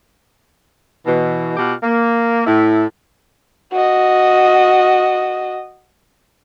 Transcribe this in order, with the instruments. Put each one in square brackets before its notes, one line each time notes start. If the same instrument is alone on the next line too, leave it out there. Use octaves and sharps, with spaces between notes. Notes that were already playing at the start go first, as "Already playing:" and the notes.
[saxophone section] B2 E3
B2 F4 G4 F#5
A#3
A2 E4
[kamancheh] F#4 D#5